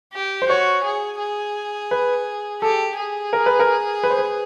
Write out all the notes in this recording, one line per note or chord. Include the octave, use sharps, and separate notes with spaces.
G4
C5
F#4 C#5
G#4
G#4
B4
G4 A4
G#4
A#4
B4
A#4
B4
C5
B4